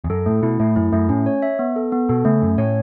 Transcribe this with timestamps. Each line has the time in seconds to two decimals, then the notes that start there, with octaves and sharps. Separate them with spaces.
0.04 E2
0.10 F#2 A4
0.26 A2 A3
0.43 B2 E4
0.60 A2 A3
0.76 F#2 E4
0.92 F#2 A3
1.09 A2 C#4
1.26 C#5
1.42 E5
1.59 B3
1.76 A4
1.92 B3
2.09 B2 A4
2.25 C#3 A3
2.42 F#2 C#4
2.58 A2 C#5